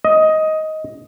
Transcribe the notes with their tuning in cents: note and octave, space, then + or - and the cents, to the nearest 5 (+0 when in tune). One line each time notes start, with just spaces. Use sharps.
D#5 +10